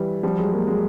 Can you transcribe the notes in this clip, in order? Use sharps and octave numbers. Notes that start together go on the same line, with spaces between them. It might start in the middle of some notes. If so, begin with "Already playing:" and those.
Already playing: E3 G3
F3 G3
F#3 G#3
G#3 A#3
F#3 G#3